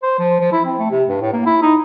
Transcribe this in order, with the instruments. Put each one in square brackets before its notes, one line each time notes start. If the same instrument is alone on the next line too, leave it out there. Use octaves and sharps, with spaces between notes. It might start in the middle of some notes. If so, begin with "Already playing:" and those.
[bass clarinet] C5
F3
F3
E4
C4
A3
C3
G2
A2
A#3
E4
D#4